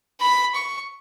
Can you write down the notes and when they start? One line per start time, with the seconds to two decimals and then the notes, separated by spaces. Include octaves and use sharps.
0.21 B5
0.55 C#6